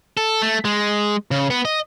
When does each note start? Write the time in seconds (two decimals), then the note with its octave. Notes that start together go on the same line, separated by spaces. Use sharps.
0.17 A4
0.42 A3
0.65 G#3
1.31 C#3
1.50 B3
1.65 D#5